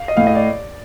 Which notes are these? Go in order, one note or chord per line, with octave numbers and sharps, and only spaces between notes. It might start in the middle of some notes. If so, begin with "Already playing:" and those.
Already playing: F5
D#5
A2 F5
D#5
D5